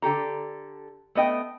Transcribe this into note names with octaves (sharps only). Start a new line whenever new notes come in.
D3 G4 A4 A#5
A3 B3 D#5 G5